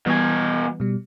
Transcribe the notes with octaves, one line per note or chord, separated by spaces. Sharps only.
B2 E3 G3 B3 G#5
B2 G3